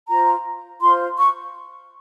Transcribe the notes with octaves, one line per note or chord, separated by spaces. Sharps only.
F4 C5 A#5
F4 C5 C6
C#6